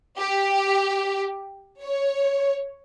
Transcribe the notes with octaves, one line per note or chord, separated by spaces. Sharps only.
G4
C#5